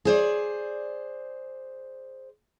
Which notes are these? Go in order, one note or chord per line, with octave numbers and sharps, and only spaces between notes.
G#4 C5 D5